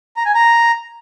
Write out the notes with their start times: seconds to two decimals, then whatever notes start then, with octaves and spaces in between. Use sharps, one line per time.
0.17 A#5
0.26 G#5
0.34 A#5